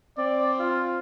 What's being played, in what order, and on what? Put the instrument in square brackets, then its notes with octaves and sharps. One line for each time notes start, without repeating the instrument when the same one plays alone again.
[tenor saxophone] C4 [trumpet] D5
[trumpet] F4